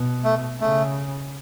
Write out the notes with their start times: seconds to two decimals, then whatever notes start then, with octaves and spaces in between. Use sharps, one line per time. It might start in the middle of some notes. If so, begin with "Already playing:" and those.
Already playing: B2
0.24 A3
0.60 C#3 A3